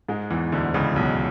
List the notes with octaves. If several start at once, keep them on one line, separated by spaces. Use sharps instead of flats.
G#2 G#3
E2 E3
D2 D3
C#2 C#3
B1 B2